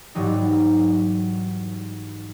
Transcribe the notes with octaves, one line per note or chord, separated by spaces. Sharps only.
G#2 E3 F#3 G3 D#4